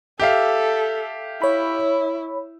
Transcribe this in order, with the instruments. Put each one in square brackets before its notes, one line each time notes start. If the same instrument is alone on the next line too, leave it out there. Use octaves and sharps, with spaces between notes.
[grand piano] G4 E5 F5 [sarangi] A4
[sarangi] E4 [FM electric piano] C#5 B5